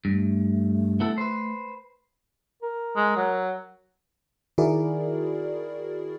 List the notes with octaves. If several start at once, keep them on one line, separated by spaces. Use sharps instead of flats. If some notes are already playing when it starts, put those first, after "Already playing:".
G2 A3
B3 E4 A4
B4 C5
A#4
G#3
F#3
D#3 E4 F#4 G#4 A#4 D5